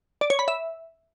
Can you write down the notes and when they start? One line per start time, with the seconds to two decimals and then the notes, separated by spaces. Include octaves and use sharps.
0.21 D5
0.30 C#5
0.39 B5
0.48 E5